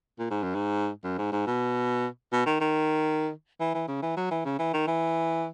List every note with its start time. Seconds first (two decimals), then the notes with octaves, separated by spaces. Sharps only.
0.19 A#2
0.31 G#2
0.43 F#2
0.55 G#2
1.04 F#2
1.18 G#2
1.32 G#2
1.47 B2
2.33 B2
2.46 D#3
2.61 D#3
3.60 E3
3.74 E3
3.88 C#3
4.02 E3
4.17 F#3
4.31 E3
4.45 C#3
4.59 E3
4.74 D#3
4.87 E3